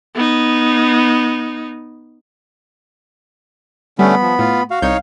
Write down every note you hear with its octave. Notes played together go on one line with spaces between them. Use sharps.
B3 D#4
D3 G3 A3 B3 C#4 B5
F3
A2 F4
F#4 F5
C2 D#4 C#5 G6 G#6